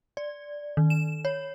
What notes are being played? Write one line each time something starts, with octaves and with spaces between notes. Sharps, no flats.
D5
D#3
E7
C#5